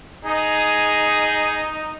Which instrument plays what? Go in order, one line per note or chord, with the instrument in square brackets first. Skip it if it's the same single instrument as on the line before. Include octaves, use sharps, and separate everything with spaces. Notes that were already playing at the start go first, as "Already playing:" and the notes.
[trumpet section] D#4 [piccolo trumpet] G#4